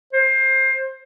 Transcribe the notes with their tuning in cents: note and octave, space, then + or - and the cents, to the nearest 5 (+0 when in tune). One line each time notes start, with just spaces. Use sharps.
C5 +20